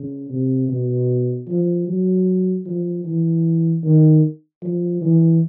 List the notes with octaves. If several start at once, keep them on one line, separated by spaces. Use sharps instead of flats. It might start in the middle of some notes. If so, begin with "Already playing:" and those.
Already playing: C#3
C3
B2
F3
F#3
F3
E3
D#3
F3
E3